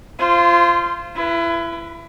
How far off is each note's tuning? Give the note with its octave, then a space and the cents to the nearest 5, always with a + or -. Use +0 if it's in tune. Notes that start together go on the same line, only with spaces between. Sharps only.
F4 -25 C5 +0
E4 +30 B4 -15